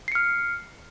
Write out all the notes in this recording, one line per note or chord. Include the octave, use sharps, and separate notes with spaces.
F6 C7 C#7